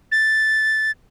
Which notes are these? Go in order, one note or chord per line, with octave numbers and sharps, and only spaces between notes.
A6